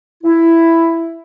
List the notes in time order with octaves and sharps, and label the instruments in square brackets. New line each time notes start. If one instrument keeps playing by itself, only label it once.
[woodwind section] E4